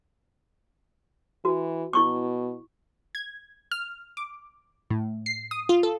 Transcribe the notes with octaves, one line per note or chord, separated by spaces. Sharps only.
E3 F#4
B2 E4 C#6 D6
G#6
F6
D6
A2
C7
D#6
F4
A4